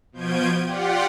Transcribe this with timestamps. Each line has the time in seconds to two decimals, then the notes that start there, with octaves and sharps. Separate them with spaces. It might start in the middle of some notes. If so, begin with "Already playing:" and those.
0.12 B2 F3 G6 G#6 D7 D#7
0.64 F4 G4 D5 F#5